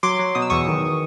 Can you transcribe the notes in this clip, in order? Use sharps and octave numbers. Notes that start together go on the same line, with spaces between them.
F#3 C6 D6
F#3
B2 D#6
E6
E2 C#6 D#6
D#3